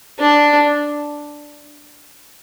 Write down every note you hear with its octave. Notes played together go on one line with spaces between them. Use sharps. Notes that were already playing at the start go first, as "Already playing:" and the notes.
D4